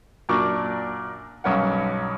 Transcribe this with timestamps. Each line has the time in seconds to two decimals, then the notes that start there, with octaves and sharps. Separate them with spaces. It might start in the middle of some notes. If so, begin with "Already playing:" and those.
0.29 F#2 A#2 D4 A#4 D5 C#6
1.44 B1 G2 C#4 A#4 F#5